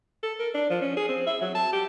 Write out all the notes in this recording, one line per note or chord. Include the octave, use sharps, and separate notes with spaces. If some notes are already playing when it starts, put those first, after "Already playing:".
A4
A#4
D4
F3
C#4
G#4
C4
E5
F#3
A5
G4